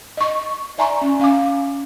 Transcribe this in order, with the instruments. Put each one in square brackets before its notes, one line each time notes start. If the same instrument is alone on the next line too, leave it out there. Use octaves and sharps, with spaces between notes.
[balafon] D#5 C#6
D5 E5 G#5 A#5 C6 C#6
C#4
C#4 F5 G#5 D6